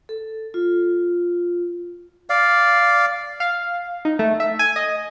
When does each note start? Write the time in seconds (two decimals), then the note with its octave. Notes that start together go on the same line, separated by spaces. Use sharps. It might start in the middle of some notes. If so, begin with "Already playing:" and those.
0.09 A4
0.54 F4
2.30 D5 F5
3.40 F5
4.05 D#4
4.19 A3
4.40 E5
4.59 G#5
4.76 D#5